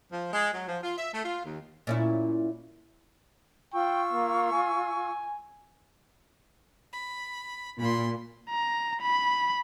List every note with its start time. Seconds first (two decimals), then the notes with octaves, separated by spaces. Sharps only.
0.12 F3
0.33 G#3
0.53 F#3
0.67 F3
0.82 F4
0.98 E5
1.13 A3
1.24 F4
1.44 D#2
1.87 A#2 C#4 E4
3.73 F4 G5 C#6 E6
4.12 A#3
4.52 G#5
6.93 B5
7.80 A#2 B5 C6
8.50 A#5
9.01 B5